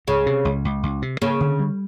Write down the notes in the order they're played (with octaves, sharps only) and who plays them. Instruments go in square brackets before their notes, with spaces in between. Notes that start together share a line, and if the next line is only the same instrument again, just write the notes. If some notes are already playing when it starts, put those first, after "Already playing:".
[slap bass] C#2 [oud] C#3
[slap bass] C3
C#2
C#2
C#2
C3
[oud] C#3 [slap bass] A#3
[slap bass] D3
G3